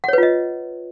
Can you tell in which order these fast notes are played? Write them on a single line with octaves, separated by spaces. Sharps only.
F#5 C#5 B4 F4 D#5